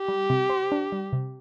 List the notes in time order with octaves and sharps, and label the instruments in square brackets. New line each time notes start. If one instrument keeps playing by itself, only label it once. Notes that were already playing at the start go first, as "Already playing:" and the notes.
Already playing: [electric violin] G4
[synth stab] G3
C3
C5
D4
G3
C3